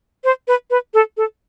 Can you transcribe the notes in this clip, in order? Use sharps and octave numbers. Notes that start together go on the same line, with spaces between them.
C5
B4
B4
A4
A4